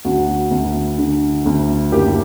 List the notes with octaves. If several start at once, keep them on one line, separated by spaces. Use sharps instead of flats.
D2 F#4
D2
D3
D2
F#1 G4